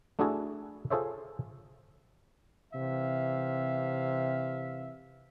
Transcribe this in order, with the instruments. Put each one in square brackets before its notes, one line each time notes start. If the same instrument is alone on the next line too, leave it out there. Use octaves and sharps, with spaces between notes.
[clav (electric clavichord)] A3 D4 E4 F#4 G#4 A4
F4 G#4 A4 C5 C#5 E5
[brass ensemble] C3 E3 E5 F5